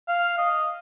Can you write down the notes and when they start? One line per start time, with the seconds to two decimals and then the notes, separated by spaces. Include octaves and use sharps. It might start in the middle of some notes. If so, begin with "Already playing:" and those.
0.08 F5
0.38 D#5